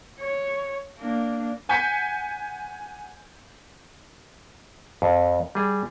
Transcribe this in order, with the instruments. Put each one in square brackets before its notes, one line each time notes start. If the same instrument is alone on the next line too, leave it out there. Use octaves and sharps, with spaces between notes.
[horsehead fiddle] C#5
A#3 D4
[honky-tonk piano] F#5 G#5 G6 G#6 B6 C#7
[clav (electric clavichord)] F2
G3 G#4